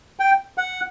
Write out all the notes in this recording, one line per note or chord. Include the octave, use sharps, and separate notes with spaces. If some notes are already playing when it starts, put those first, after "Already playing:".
G5
F#5